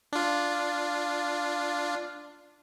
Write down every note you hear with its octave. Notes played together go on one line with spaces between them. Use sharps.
D4 F4